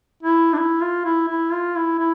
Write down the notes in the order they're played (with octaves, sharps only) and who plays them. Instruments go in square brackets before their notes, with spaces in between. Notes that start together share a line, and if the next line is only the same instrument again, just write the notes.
[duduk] E4
D4
E4
F4
E4
E4
F4
E4
E4